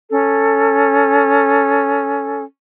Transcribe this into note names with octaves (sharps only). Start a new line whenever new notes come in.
C#4 A4